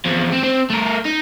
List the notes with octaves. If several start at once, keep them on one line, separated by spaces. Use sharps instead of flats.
E2 F3
C4
C4
A3 A#4
D#4